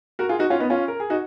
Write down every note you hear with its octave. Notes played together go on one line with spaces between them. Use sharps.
F#4 A#4
F4 G#4
D#4 F#4
C#4 F4
B3 D#4
C#4 F4
A#4
G#4
D#4 F#4